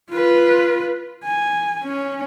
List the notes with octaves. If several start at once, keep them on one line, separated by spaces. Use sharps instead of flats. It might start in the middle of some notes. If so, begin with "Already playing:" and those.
F4 B4
G#5
C#4